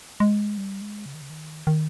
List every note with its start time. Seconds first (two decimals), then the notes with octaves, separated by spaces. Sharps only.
0.20 G#3
0.58 G3
0.82 G#3
1.06 C#3
1.14 D#3
1.22 C#3
1.30 D#3
1.67 D#3